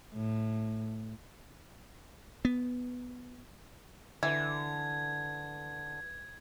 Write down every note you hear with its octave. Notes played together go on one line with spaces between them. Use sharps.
A2
B3
D3 E3 G#6